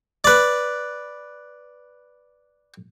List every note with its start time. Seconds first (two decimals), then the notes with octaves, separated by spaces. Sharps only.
0.24 B4 D5